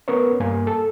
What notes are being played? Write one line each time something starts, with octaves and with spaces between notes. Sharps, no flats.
B3 C#4 A#4 B4 C#5
G2 A#3 G#5
A4 A5